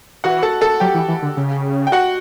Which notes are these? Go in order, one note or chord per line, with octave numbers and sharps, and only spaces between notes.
E3 F#4 F#5
A4 A5
A4 A5
F#3 G4 G5
E3
E3
D3
C#3
G5
F#4 F#5